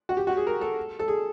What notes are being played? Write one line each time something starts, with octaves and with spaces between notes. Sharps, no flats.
F#4
G4
F#4
G#4
A#4
A4
A4
G#4